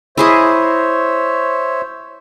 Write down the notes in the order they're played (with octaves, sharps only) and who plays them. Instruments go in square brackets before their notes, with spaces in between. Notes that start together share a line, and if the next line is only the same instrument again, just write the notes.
[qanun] E4 G#4 D#5 [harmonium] C5 C#5 E5